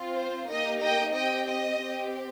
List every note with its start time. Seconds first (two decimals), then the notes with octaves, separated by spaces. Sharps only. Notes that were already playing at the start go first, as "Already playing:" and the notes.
Already playing: C4 F4
0.16 C5
0.49 A#3 D#4 G4 D#5
0.82 D#5 G5
1.15 C4 G4 D#5 G5
1.47 D#5
1.80 C4 G4